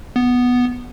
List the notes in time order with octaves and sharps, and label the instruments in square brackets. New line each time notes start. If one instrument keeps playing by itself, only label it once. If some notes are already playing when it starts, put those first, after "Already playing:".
[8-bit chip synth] B3